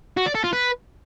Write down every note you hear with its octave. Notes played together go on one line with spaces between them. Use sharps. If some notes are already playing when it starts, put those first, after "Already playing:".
F#4
D5
A4
F4
B4